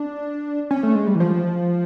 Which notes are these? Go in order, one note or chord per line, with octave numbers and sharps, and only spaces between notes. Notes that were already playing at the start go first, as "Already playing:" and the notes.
Already playing: D4
C#4
A3
G#3
G3
E3
F3